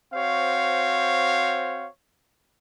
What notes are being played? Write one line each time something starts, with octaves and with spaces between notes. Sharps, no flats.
C4 F#4 C5 C#5 F5